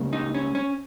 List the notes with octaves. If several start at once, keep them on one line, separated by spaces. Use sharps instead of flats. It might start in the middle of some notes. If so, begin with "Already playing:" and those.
Already playing: C#2 C#3 G3 A#3
D#4
C#4
C#4